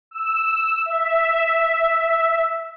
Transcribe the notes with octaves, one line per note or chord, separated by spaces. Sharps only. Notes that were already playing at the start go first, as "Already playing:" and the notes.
E6
E5